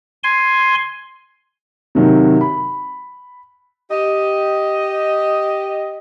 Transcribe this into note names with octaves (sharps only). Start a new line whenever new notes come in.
G#5 C6
C3 D#3 F#3
B5
G4 D#5